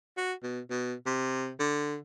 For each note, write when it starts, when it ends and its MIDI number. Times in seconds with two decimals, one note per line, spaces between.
0.17 0.33 66
0.43 0.60 47
0.70 0.94 47
1.06 1.52 48
1.59 1.97 50